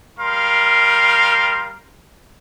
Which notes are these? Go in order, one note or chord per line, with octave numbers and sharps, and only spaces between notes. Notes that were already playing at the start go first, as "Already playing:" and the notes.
G3 A#4 F5 C6